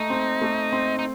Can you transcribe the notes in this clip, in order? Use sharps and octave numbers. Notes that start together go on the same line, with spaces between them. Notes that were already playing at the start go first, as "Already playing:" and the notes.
Already playing: A3 D#4
C4
A3
C4
D#4